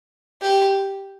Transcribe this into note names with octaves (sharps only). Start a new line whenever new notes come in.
G4